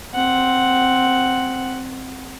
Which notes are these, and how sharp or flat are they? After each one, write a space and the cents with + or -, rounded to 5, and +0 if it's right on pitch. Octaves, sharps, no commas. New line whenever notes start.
C4 +0 F#5 +0